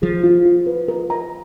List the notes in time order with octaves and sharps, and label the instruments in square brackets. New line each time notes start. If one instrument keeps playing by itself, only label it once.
[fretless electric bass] F3 [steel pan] G#4
[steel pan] F4
F4
B4
A#4
A#5